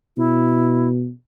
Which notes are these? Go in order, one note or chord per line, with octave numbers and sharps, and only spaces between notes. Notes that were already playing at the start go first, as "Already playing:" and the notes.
B2 E4